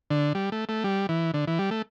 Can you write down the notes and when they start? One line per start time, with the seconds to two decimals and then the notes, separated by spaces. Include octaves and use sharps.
0.10 D3
0.35 G3
0.52 A3
0.69 A3
0.84 G3
1.09 E3
1.34 D3
1.47 E3
1.59 G3
1.71 A3